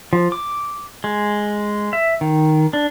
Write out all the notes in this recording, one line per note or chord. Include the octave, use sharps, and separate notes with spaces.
F3
D6
G#3
E5
D#3
D4